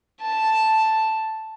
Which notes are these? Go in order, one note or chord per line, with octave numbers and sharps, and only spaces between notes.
A5